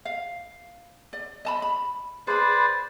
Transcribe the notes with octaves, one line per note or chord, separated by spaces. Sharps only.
F5
D5
D#5 A5 B5
B5
G#4 B4 C5 D5 B5